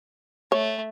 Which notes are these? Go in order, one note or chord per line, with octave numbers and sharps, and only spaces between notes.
A3 C#5